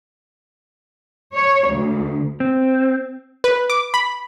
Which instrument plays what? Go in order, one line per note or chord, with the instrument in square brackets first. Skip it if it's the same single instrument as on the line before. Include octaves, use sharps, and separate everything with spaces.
[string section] C#5
D2
[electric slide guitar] C4
[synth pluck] B4
D6
B5